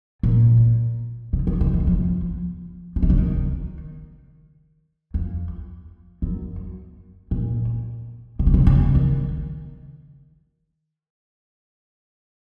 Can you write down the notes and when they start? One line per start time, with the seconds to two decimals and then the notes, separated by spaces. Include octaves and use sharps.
0.23 A#2
1.33 C#3
1.47 D#3
1.61 C#3
1.74 D#3
1.87 F3
2.96 F3
3.03 D#3
3.10 C#3
3.18 D#3
5.14 F2
6.22 F#2
7.31 A#2
8.39 C#3
8.47 C3
8.54 C#3
8.67 C#3
8.95 D#3